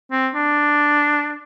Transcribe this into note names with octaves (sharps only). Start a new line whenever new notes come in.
C4
D4